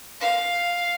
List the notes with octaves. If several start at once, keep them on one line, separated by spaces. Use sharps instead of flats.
F5